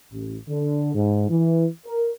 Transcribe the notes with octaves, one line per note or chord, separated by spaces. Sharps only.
A1
D3
G#2
E3
A#4